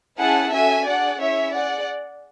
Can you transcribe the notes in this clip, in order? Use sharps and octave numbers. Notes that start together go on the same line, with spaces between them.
C#4 E4 G#4 F#5 A5
C#4 F#4 A4 E5 G#5
D4 G#4 D5 F#5
C#4 E4 G#4 C#5 E5
G#4 D5 F#5